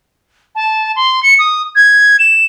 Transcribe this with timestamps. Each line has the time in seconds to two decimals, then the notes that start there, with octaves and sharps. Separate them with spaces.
0.55 A5
0.96 C6
1.22 C#7
1.38 D#6
1.75 G#6
2.19 E7